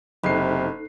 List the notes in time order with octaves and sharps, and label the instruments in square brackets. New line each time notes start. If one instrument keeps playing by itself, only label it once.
[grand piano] F#1 C7 [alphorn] C3 [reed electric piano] D#4 A4 F#6 [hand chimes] D#5 B5